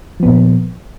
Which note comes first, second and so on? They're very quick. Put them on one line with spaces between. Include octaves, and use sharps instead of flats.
F3 B3 A#2